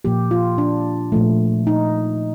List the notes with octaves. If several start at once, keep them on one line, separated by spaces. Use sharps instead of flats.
A#2 F3 A#3 G4
F4
D4
A#2 F3 A3
D#4